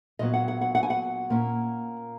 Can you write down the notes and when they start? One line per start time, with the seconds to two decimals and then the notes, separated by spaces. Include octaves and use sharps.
0.19 A#2 F#3 B3 D#5
0.34 F#5
0.48 F#5
0.61 F#5
0.75 F#5
0.83 G#5
0.90 F#5
1.30 A#2 A#3 C#4